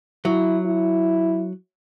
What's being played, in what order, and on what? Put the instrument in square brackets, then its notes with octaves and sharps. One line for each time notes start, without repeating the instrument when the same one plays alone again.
[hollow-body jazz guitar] F#3 [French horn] E4
[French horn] E4